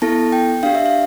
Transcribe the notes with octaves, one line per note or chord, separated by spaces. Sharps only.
B3 E4 A4 A5
G5
D4 G4 F5
E5
F5